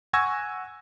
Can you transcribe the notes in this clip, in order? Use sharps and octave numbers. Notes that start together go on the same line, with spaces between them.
F#5 G#5 C#6 E6 G#6 A#6